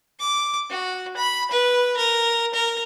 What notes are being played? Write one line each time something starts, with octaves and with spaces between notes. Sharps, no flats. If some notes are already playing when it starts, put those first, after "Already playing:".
D6
F#4
B5
B4
A#4
A#4